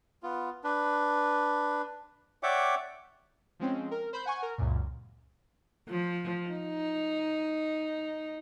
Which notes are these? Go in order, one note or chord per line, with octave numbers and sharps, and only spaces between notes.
B3 F4
D4 B4
C#5 D5 E5 F#5 G5 D6
F3 G#3 C4 C#4
A#4
C5 B5 G6
F#5 G#5 C#6
A#4
C#2 F#2 A#2
F3
D#4